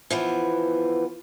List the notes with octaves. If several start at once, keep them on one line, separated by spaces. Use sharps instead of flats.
E3 F3 B3